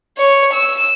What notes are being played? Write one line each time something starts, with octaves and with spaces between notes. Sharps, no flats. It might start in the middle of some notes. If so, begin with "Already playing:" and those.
C#5
E6